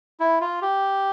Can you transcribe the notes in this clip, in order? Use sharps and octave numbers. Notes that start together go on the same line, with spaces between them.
E4
F4
G4